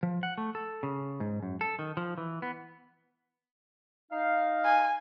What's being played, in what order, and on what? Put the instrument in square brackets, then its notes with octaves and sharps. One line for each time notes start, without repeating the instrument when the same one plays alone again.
[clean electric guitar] F3
F#5
A3
A4
C#3
G#2
F#2
A4
D#3
F3
E3
B3
[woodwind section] D#4 F5
[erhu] G#5